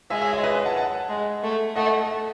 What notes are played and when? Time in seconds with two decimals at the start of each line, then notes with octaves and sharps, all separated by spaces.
0.10 G#3 E5 G#5
0.21 C#5 E5
0.33 C#5 E5
0.44 B4 D#5
0.54 B4 D#5
0.65 F#5 A5
0.76 F#5 A5
1.09 G#3
1.43 A3
1.76 A3 D#5 F#5